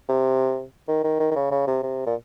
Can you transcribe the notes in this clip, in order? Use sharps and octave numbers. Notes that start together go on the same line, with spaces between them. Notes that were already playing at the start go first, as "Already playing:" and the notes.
C3
D#3
D#3
D#3
D#3
C#3
C#3
C3
C3
A#2